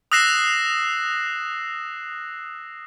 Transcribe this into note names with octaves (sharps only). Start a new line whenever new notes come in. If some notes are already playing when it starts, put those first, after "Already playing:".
D#6 E6 F#6 A#6 C7 E7